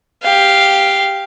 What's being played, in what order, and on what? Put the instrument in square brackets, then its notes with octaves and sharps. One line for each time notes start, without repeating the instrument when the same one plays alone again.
[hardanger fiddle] G4 F5